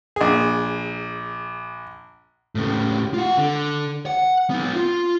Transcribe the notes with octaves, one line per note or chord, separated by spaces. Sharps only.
A#1 G#4
A2 C#3
F4 F#5
D3
F#5
B3 D#4
F4